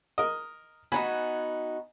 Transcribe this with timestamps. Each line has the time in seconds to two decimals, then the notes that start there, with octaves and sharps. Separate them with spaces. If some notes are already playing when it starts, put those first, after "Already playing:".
0.18 A#4 D#5
0.92 B3 D#4 F#4 G#5 B5